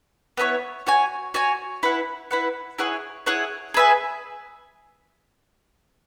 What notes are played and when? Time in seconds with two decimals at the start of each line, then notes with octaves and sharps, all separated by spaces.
0.37 B3 E4 A#4 C#5
0.87 F#4 C#5 G#5
1.34 F#4 C#5 G#5
1.83 E4 B4 F#5
2.31 E4 B4 F#5
2.78 E4 G#4 C#5 F#5
3.26 E4 G#4 C#5 F#5
3.74 G#4 B4 E5 G#5